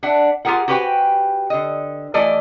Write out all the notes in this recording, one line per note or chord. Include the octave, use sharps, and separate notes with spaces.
D4 E5 F#5
F4 G4 G#4 A#4 F#5
F#4 G4 B4 C5 G5 G#5
D3 D#5
E3 A3 D5 D#5